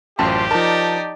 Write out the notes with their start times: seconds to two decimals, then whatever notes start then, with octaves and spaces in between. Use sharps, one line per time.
0.19 A1 F#2 F4 G4 C5 G5 A5
0.51 F3 D#4 A#4 D5 A5